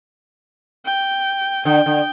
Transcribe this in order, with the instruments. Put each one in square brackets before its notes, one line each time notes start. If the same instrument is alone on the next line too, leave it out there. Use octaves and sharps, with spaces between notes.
[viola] G5
[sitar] D3 [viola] G5
[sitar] D3